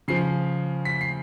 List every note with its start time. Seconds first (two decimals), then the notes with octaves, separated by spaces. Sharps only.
0.08 C#3 F3 C7
0.85 B6
1.01 C7